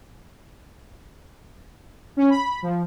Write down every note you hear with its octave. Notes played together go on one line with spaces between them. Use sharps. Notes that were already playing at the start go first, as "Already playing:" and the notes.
C#4
B5
F3